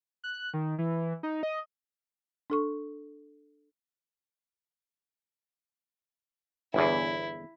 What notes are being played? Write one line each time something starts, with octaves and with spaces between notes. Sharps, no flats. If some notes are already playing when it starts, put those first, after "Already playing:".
F#6
D#3
E3
D#4
D#5
D4 A4 C#6
G1 E2 E4